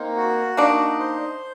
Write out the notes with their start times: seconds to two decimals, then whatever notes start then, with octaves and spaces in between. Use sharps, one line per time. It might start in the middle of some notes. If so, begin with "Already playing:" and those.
Already playing: A#3 C4 D#4
0.17 F#4
0.57 A#3 D4 D#4
0.99 C5